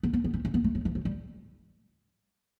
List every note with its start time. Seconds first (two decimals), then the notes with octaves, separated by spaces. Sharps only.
0.03 B3
0.13 B3
0.24 B3
0.34 C#4
0.45 C#4
0.54 B3
0.64 A3
0.75 F#3
0.85 E3
0.95 F#3
1.05 G3